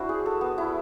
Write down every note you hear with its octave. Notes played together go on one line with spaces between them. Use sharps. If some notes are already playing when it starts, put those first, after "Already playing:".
Already playing: D4 E4 F#4 C5
G#4
A4
B3
E4